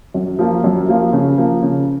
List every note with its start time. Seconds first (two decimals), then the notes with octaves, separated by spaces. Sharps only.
0.14 F#2
0.39 F3 A#3 F4
0.64 F#2
0.89 F3 A#3 F4
1.13 C#3
1.38 F3 A#3
1.63 C#3